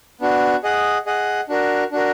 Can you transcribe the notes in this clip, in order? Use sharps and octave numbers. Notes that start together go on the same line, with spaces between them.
B3 D4 F#4
G#4 D#5 F#5
G#4 D#5 F#5
D4 F#4 A#4
D4 F#4 A#4